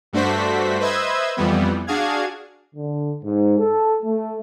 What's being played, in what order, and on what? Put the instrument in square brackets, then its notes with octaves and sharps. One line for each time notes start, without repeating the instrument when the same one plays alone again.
[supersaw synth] G2 A3 D4 F#4 C5 B6
B4 C5 D#5 E5 E6 G#6
F2 E3 G3 B3
D4 F#4 G#4 F5 G#6
[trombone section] D3
G#2
A4
A3